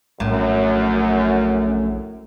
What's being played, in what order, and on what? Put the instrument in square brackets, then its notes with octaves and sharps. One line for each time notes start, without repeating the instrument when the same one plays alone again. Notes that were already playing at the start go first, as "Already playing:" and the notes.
[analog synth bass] A#1 [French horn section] F#2 [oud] A2